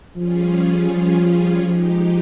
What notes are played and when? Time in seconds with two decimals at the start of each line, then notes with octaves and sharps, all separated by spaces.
0.16 F3 G3 C#4 F4 G#4
0.89 F3
1.63 F3 G#3 D#4 G4